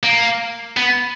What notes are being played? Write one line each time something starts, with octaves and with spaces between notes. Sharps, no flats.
A#3
B3